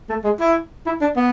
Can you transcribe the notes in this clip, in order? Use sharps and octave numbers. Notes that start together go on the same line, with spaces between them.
A3
G#3
E4
E4
D4
B3